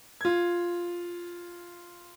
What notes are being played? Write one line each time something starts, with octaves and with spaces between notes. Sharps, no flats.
F4 G#6